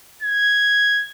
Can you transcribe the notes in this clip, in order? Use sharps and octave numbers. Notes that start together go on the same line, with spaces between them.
G#6